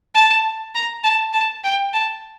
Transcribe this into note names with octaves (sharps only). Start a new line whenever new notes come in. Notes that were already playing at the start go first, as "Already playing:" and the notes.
A5
A#5
A5
A5
G5
A5